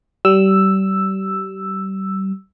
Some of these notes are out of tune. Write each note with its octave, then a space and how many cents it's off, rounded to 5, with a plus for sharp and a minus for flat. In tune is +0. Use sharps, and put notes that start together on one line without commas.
G3 -30 E6 +0